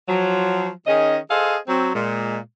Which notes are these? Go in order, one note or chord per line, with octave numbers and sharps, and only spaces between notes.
F3 F#3
D#3 C#4 G#4 D#5
G#4 A4 C5 D#5 F5
F#3 C4
A#2 G#3